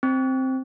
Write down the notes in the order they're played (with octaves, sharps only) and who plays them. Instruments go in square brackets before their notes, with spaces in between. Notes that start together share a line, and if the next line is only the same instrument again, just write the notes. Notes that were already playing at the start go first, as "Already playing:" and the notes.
[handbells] C4